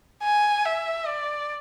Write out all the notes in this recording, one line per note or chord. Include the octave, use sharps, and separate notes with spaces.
G#5
E5
D5